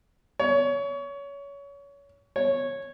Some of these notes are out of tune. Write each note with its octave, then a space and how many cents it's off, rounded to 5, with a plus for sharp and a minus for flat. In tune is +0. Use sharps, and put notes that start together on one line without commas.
C#5 +25
C#5 -10